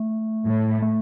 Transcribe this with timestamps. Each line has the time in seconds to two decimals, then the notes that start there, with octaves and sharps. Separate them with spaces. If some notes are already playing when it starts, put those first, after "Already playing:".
Already playing: A3
0.46 A2
0.82 A3